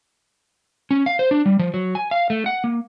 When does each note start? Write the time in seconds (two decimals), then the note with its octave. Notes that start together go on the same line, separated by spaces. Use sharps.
0.91 C#4
1.06 F5
1.19 C5
1.31 D4
1.46 G3
1.59 F3
1.74 F#3
1.95 G#5
2.11 F5
2.30 A3
2.46 F#5
2.64 A#3